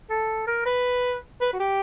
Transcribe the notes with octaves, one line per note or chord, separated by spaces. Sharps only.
A4
A#4
B4
B4
F#4
G4